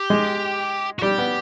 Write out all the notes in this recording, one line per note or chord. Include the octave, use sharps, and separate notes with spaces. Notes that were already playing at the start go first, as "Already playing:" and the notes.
Already playing: G4
G#3
F#4
G3 G4
B3